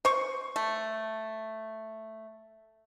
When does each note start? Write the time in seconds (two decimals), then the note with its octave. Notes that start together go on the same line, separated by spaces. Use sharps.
0.05 C5 C#6
0.56 A3